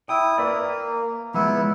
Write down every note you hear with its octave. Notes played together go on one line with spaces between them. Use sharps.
E4 G5 D#6
A#3 B4 D5
F3 G#3 B3 E4